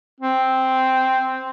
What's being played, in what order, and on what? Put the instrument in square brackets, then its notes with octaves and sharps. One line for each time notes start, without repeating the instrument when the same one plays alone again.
[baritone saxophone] C4